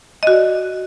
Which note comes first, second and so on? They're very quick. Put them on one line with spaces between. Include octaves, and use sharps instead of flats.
D#5 F#4 D5